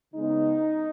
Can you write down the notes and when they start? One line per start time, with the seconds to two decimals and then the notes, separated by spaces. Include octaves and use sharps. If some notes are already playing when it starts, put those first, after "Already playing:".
0.14 C#3 G#3 B3 D#4